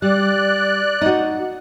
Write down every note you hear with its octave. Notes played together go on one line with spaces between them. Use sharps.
G3 D5 F#6
D#4 F#4